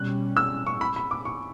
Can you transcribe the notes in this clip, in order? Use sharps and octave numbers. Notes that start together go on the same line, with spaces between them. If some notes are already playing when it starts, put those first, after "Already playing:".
Already playing: B2 G3 C#4 F#6
E6
C#6
B5
B5
D6
C#6